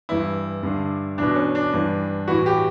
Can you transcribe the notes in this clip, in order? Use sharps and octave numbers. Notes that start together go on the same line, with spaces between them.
G2 E3 E4
G2 D3
E2 B2 D4
C#4
D4
G2 E3
A2 E3 F#4
G4